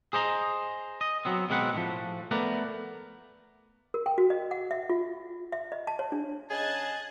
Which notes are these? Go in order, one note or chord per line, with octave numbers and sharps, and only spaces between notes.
G#4 C5 D#5 A#5
D#5
F#3 B3 C4
B2 G#3 A#3 C4 B4 F#5
A2 C#3 F3
A3 B3 A#4 B4 D5
A#4
G5
F#4
D#5
F#5
E5
F4
E5
D#5
A5
C#5
D4
C#3 G#4 D#5 A5 F#6 G#6